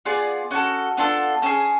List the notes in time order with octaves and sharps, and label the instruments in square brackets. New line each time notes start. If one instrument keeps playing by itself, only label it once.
[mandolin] B3 F4 G#4 D5
C#4 F#4 A4 F#5
B3 D4 F4 A4
C#4 G#4 A5